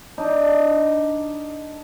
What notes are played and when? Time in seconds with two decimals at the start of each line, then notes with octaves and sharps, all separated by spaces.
0.18 D4 D#4